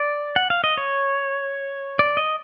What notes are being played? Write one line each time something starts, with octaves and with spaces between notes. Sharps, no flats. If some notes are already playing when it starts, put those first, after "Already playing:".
Already playing: D5
F#5
F5
D#5
C#5
D5
D#5